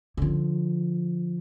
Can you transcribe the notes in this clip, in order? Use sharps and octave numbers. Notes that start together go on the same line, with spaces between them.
D3 F3